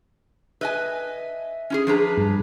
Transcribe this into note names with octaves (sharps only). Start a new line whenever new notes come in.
B4 D#5 E5 G#5
C#4 E4 G#4
F3 D4 G#4 B4 A#5 B5
G2